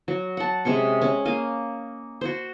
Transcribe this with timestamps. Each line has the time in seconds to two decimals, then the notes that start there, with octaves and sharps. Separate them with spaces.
0.08 F#3
0.37 F#5 A5
0.65 C3 G#3 C#4 C#6
1.01 C#4
1.25 A#3 D#5 F5
2.21 F#4 C5